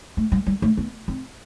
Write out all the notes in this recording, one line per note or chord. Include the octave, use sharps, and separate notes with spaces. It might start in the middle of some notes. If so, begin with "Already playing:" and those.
A3
G3
G3
A3
B3
C4